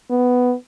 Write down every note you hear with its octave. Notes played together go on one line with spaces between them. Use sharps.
B3